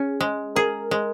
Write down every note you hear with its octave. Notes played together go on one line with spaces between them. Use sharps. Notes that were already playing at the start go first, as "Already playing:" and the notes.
Already playing: C#4 G#4
G#3
G#4 A#4
G#3